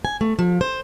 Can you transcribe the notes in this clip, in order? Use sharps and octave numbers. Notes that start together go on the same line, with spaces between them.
G#5
A3
F3
C5